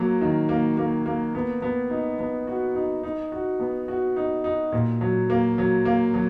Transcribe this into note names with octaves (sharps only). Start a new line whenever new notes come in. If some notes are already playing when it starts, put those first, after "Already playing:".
Already playing: F#3 A#3
D#3
A#3
A#3
A#3
B3
B3
D#4
B3
F#4
D#4
D#4
F#4
B3
F#4
D#4
D#4
A#2
F#3
A#3
F#3
A#3
F#3